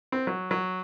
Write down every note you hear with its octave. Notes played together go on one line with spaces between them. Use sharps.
C4
F#3
F#3